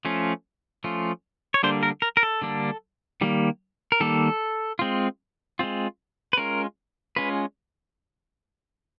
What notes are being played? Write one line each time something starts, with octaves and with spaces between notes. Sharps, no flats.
F3 A3 C#4 F4
F3 A3 C#4 F4
C#5
D3 G3 A#3 D4 C5
A#4
A#4
A#4
A4
D3 G3 A#3 D4
D#3 G3 A#3
A#4
D#3 G3 A#3 A4
G#3 C4 F4
G#3 C4 F4
B4
G#3 C#4 F4 A#4
G#3 C#4 F4 B4